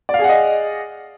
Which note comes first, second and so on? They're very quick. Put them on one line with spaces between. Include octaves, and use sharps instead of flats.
D5 F5 G#4 F#5 D#5